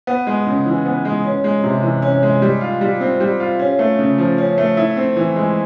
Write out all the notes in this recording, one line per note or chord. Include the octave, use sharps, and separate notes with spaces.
B3
G#3
C#3
E3
B3
G#3
C#4
G#3
C3
E3
C#4
G#3
G3
F4
G3
C4
G3
F4
C#4
A3
C#3
F3
C#4
A3
E4
C4
E3
G#3